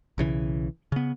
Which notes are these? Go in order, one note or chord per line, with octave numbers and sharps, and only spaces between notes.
B1 C#3 E3
C#3 B3